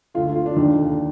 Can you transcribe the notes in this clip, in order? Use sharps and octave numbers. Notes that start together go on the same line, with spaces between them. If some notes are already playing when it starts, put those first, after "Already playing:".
D2 D3 F4
F4
D4
D#2 D3 D#4